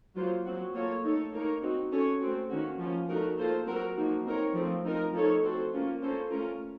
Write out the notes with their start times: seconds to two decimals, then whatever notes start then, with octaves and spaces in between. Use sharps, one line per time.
0.15 F#3 A#3 F4 C5
0.45 F#3 C4 F#4
0.74 A#3 F4 A4 C#5
1.04 A3 D#4 A4 C#5
1.32 A#3 D#4 A#4 C#5
1.62 C4 D#4 F#4
1.91 C#4 F#4 A4 C#5
2.20 A3 C4 F#4
2.50 D#3 A#3 C#4 F#4
2.79 F3 A#3 C#4 F4
3.08 A3 D#4 F#4 A#4
3.38 A#3 F4 A4 C5
3.66 F#3 C4 F#4 A#4
3.96 F3 A#3 D#4 F#4
4.25 C4 D#4 A#4 C#5
4.54 F3 A3 C4 F4
4.84 F3 C4 D#4 A#4
5.13 F3 A3 D#4 A4 C#5
5.42 C4 F#4 A4 C5
5.72 A#3 C#4 F4
6.01 A#3 C#4 A4 C5
6.30 A3 C#4 F4 A#4